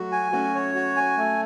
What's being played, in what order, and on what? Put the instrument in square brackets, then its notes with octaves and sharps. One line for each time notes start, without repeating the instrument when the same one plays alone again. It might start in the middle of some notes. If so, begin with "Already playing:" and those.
Already playing: [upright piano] F#3 A3 [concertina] F#4
[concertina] G#5
[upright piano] A3 C#4 [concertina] F#4
[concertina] C#5
F#4
G#5
A3